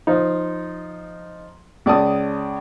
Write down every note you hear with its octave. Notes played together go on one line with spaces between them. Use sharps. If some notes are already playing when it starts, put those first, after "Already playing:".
F3 D#4
C#2 D5 A5 D#6